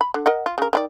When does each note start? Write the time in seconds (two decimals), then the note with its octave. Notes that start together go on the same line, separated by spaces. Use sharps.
0.01 B5
0.14 D3
0.26 A#4 D#5 F#5
0.46 F4
0.58 C#3 A#4
0.73 D#3 E4 D5